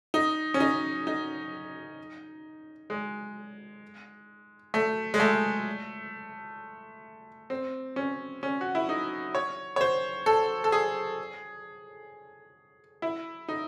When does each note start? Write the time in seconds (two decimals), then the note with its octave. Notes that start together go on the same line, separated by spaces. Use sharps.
0.14 D#4
0.54 C#4
0.60 D#4
1.07 D#4
2.90 G#3
4.74 A3
5.14 G#3
5.20 A3
7.50 C4
7.96 C#4
8.43 C#4
8.61 F#4
8.75 E4
8.89 D#4
9.35 C#5
9.76 C#5
9.81 C5
10.26 A4
10.64 A4
10.72 G#4
13.02 E4
13.48 D#4